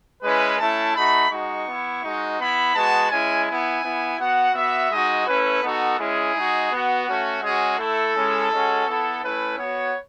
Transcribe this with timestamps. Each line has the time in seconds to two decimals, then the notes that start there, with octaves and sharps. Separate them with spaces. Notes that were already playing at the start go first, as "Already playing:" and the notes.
0.23 G#3 C#4 E4 B4
0.59 A3 C#4 E4 A5
0.95 A3 D#4 F#4 B5
1.30 G#3 D#4 F#4 C#6
1.67 B3 E4
2.03 G#3 D#4 F#4
2.39 B3 E4 B5
2.75 G#3 B3 F#4 A5
3.11 G#3 C#4 E4 G#5
3.47 B3 E4 G#5
3.83 B3 E4
4.19 B3 F#4 F#5
4.54 B3 F#4 E5
4.91 G#3 D#4 F#4 D#5
5.27 A3 C#4 E4 B4
5.63 B3 D#4 F#4 A4
5.99 G#3 C#4 E4 G#4
6.35 G#3 D#4 F#4
6.71 B3 F#4
7.07 A3 C#4 F#4
7.42 G#3 C#4 F#4 G#4
7.79 A3 E4 A4
8.15 G#3 C#4 E4
8.51 G#3 C#4 F#4
8.87 B3 E4 A4
9.23 A3 C#4 E4 B4
9.58 B3 F#4 C#5